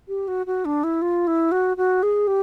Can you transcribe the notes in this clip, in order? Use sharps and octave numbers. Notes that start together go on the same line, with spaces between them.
G4
F#4
F#4
D4
E4
F4
E4
F#4
F#4
G#4
G4